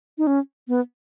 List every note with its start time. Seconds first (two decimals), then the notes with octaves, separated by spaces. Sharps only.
0.18 D#4
0.27 C#4
0.68 B3